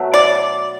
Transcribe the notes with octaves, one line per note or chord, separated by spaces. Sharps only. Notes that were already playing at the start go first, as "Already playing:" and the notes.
Already playing: B2 F#3 A3
D5